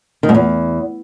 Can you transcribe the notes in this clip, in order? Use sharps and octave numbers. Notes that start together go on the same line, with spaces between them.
D#3
G#2
E2